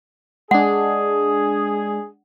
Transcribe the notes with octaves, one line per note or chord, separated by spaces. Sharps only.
G#3 D4 G#4 F#5